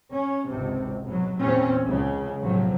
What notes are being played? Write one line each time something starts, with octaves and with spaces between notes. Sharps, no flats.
C#4
G#1 C#2 C3
G#2 B2 F#3
E2 A#2 C4 C#4
C#2 C#3
B1 A2 C3 F3 F#3